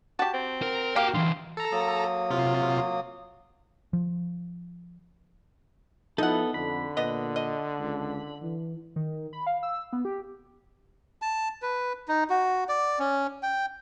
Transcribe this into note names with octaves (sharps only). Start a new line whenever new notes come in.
F#4 G4 A5
C4
A#4
A#3 F#4 G4 F5 G5
D3 E3 C6
A4 A#5
F#3 A#3 D#6
C3 F4
F3
F3 B3 D#4 E4 A4 F#5
F2 D3 B5
A#2 B3 D#5
D#5
C#2
E3
D#3
B5
F5
E6
B3
G4
A5
B4
D#4
F#4
D5
C#4
G5